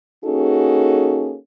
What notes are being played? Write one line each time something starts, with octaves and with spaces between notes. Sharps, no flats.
A#3 C#4 D#4 F#4 G#4 A4